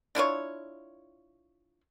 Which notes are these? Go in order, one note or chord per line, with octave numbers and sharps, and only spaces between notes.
D4 E4 F4 C#5